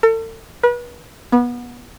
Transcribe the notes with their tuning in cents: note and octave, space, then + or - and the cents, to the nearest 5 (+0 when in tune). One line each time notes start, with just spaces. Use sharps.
A4 +40
B4 -35
B3 -25